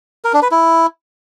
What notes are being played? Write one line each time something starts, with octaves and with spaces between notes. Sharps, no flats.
A#4
D4
B4
E4